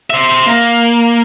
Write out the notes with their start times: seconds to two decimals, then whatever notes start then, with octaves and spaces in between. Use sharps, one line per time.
0.10 C5 E5
0.46 A#3